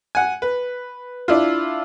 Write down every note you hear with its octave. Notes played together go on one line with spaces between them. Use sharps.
F#5 G#5
B4
D4 E4 F4